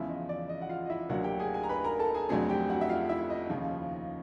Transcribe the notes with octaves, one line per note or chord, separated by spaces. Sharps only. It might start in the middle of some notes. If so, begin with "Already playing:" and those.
Already playing: E2 C#3 F3 G#3 E4 E5
D#5
D5
D#5
F#5
F4 F5
D#5
E4 E5
D2 D3 F#3 A#3 F#4 F#5
G4 G5
G#4 G#5
G#4 G#5
A#5
B4 B5
A#4 A#5
A4 A5
G#4 G#5
F2 D3 F#3 A3 C4 G#4 G#5
G4 G5
F#4 F#5
E5
F4 F5
E4 E5
D#5
D#2 C#3 F3